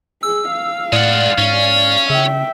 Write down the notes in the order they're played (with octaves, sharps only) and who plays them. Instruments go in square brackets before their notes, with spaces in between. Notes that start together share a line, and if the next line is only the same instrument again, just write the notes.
[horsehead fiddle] G#4 [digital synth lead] E6
[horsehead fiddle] F5
[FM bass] A2 [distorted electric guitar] G#3 F#5 [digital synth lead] D5
[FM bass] G#2 [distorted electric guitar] C#4
[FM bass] C#3 [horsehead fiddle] E5 G5